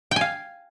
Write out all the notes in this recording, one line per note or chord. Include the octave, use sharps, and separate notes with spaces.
F5 G5 G#5